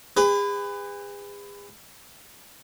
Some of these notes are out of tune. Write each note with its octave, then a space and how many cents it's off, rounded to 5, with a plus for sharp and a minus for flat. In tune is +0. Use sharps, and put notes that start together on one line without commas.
G#4 -40 B4 +25